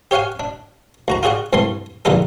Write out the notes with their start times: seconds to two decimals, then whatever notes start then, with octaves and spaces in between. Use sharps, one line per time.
0.11 G4 C#5 F5 F#5 G#5
0.40 D4
1.08 D2 F#4 A#5
1.23 F4 F#4 G#4 D5 F#5
1.53 C2 G2 E3 A3 C6
2.05 A#1 E2 G2 D3 D#4 A4